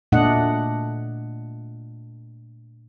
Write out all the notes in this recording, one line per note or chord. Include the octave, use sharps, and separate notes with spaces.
A#2 A3 D4 D#5 F#5